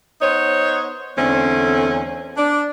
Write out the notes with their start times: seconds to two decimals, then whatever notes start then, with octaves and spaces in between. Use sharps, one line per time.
0.22 B3 D#4 C5 C#5
1.17 E2 D3 A3 C4 C#4
2.37 D4